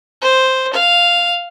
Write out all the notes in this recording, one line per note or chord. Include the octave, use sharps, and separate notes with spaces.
C5
F5